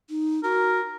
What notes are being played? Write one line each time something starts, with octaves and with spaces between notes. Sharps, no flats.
D#4
F#4 A#4